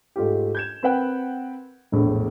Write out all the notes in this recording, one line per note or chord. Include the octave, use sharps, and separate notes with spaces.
G#2 A3 F4 G4
G6 G#6 E7
C4 A#4 B4 F#5 G5
E1 A#1 A2